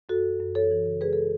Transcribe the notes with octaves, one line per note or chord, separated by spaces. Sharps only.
F#2 F#4 A4
F#2
F#2
E3 A4 C#5
E3
C#3
G#3 G#4 B4
A4